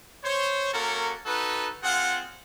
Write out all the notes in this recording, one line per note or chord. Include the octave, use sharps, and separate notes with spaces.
C5 C#5
A#3 C#4 F#4 A4 A#4
D#4 F#4 A4 B4
C4 F4 G#4 F#5